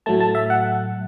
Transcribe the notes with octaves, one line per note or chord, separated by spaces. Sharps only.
A2 F#3 A3 A5
A5
E5
F#5